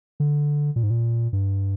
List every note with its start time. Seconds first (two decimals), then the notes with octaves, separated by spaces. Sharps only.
0.20 D3
0.76 A#2
0.83 G#2
0.90 A#2
1.33 G2